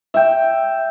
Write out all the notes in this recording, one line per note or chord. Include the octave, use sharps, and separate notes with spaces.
E5 G5